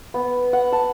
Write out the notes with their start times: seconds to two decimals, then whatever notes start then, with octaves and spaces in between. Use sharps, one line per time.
0.14 B3
0.53 F#5
0.72 A5